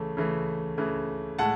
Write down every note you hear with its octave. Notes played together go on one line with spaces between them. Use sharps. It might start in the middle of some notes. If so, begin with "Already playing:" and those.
Already playing: C#3 E3 A3
C#3 E3 A3
C#3 E3 A3
A2 G#3 F#5 A5